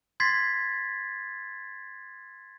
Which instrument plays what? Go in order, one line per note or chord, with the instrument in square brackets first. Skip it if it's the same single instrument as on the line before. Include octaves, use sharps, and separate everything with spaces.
[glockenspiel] C6 G#6 A6 B6 C7